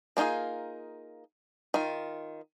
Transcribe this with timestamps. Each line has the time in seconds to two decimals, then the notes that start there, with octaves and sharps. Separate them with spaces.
0.17 A#3 D4 D#4 F4 G#4
1.74 D#3 F4